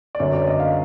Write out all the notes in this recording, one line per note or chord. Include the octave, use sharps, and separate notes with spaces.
D5
G1 F#2 D3 C#5
D5
D#5
F5